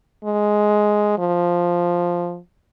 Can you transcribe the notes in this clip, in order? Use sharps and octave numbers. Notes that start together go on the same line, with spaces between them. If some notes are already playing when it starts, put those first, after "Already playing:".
G#3
F3